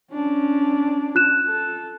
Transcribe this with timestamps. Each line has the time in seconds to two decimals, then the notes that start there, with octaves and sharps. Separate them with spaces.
0.13 C#4 D4
1.15 F4 F#6 E7
1.47 A4